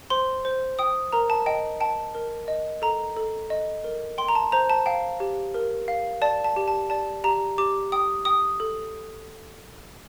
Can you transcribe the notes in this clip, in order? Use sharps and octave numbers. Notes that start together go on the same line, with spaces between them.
C5 C6
C5
G5 D#6
A#4 A#5
A5
D#5 G5
G5 A5
A#4
D#5
A4 A#5
A4
D#5
A#4
G5 C6
A#5
A5
C5 A#5
A5
F5 G5
G4
A#4
F5
D5 A5
A5
G4
A5
D5 A5
G4 A#5
G4 D6
G5 D#6
G5 D#6
A4